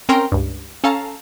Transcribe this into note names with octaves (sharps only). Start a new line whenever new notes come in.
C4 C#4 A#4 G5 A#5 C6
C#2 G2
C#4 A4 F5 A5 A#5